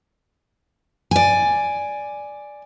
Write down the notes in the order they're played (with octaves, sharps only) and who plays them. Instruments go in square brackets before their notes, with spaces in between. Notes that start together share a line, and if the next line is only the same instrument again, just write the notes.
[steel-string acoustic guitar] D5 G#5